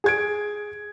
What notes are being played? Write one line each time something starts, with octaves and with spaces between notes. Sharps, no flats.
G#4 G#6 D7